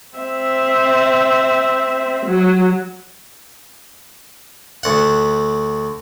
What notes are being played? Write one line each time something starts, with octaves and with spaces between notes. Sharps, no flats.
C4 E5
F#3
D2 F#5